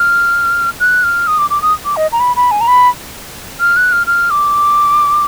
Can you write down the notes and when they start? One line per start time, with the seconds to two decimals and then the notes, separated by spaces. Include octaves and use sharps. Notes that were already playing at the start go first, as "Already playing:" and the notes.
Already playing: F6
0.80 F#6
1.03 F6
1.27 D#6
1.38 D6
1.50 D6
1.62 D#6
1.85 D6
1.96 D#5
2.12 A#5
2.20 B5
2.36 B5
2.51 G#5
2.61 A#5
2.67 B5
3.60 F6
3.77 F#6
3.92 F6
4.07 F6
4.31 D6